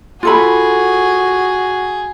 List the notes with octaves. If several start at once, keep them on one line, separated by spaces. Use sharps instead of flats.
F4 F#4 G#4 A4 B5